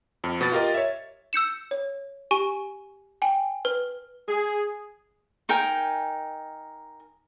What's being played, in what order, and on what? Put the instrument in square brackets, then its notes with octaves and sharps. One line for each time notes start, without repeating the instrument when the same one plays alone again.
[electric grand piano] F2
B2 B3 A6
F4 G4 A#4 D#5
C#5 E5
[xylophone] E6 G6 C#7 E7
C#5
G4 G#5 C#6 D#7
G5 G#5
B4
[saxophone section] G#4
[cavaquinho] D#4 A#4 G5 G#5